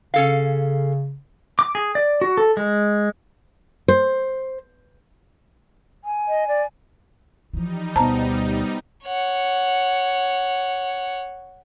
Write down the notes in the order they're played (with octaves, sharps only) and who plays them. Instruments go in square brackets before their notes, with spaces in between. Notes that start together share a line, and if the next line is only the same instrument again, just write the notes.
[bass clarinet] C#3 [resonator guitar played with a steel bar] C#4 A4 F5
[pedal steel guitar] D6
G#4
D5
F#4
A4
G#3
[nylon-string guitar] C5
[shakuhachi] G#5
[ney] D#5
D5
[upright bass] E3 F3 [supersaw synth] G3 D#4
[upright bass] D2 B2 [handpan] B3 C5 [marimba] A5 A#5
[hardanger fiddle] C#5 F#5